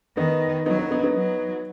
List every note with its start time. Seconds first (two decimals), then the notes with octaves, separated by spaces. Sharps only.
0.17 D#3 B3 D#4
0.66 F#3 B3 D#4
0.79 B3 D#4
0.91 B3 D#4
1.03 B3 D#4
1.16 F#3